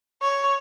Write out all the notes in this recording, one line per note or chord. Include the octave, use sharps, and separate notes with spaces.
C#5